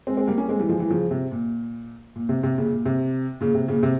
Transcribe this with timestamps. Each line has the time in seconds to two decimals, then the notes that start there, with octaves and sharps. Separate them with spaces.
0.07 G#3 C4
0.17 G#3 C4
0.27 G3 A#3
0.38 A#3 C#4
0.49 G#3 C4
0.59 E3 G3
0.69 F3 G#3
0.80 E3 G3
0.90 C#3 F3
1.11 C3
1.32 A#2
2.16 A#2
2.29 C3
2.43 C3
2.58 A#2 C#3
2.71 A#2
2.86 C3
3.41 A#2 C#3
3.55 C3
3.68 A#2 C#3
3.83 C3